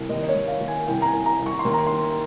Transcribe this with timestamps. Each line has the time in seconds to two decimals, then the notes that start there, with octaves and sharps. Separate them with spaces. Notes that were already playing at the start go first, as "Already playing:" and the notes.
Already playing: C2
0.09 D#2 D#5
0.23 D#5
0.29 C#5
0.35 D#2
0.48 F5
0.61 D#2
0.68 G#5
0.87 C2 G5
1.02 A#5
1.07 G#5
1.13 C2
1.26 A#5
1.39 C2
1.46 C#6
1.59 C6
1.65 D#2
1.74 A#5
1.87 D#3 C6